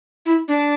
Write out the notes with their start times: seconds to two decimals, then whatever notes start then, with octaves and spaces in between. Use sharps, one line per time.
0.26 E4
0.48 D4